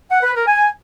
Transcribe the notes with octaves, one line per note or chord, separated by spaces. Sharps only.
F#5
B4
A#4
G#5